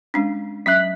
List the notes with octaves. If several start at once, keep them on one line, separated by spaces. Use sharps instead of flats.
G#3 C#4 D4
F#3 C#4 E5 F#6 B6